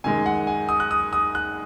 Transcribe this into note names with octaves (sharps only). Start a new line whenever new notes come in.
F#2 D#3 G#3 G#5
F#5
G#5
D#6
F#6
D#6
D#6
F#6